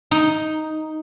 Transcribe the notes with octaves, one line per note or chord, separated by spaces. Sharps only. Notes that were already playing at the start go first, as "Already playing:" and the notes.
D#4